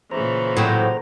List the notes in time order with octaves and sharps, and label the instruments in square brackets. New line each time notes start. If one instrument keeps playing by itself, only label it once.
[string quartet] A#2 C#3 E3 [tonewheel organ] C5 A#5
[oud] A2 [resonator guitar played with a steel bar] F#3 C4